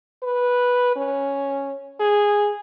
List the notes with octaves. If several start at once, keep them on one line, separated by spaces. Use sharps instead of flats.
B4
C#4
G#4